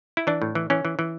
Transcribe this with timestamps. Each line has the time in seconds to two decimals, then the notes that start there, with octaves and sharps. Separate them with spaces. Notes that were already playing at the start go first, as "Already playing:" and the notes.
0.17 E4
0.27 E3 D4
0.42 A2
0.55 E3
0.70 E3 C#4
0.85 E3
0.99 E3